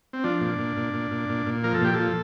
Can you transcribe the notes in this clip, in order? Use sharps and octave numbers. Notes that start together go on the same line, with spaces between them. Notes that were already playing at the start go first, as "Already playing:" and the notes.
C4
F3 D4
A#2
A#2
A#2
A#2
A#2
A#2
A#2
F3 A#4
A4
A#2 G4
A4
F3